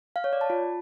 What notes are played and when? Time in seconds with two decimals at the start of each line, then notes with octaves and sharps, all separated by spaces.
0.16 F5
0.24 C#5
0.33 D5
0.41 A5
0.50 F4